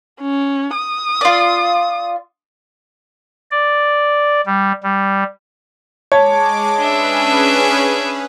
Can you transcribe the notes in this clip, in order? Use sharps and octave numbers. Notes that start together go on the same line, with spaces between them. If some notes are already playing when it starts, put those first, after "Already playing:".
C#4
D#6
F4 D5
D5
G3
G3
G#3 C#5 A5 D6
C#4 D4 G#4 B4 E5